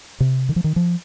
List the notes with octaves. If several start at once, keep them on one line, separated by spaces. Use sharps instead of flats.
C3
D#3
F3
D#3
F3